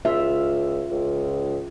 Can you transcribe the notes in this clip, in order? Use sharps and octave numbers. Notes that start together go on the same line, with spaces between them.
C#2 F4 E5
C#2